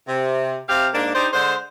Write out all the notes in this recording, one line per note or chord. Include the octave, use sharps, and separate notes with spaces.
C3
C3 G4 F5
G#2 A#3 D4
D4 D#4 G4 C5
D3 G#3 C5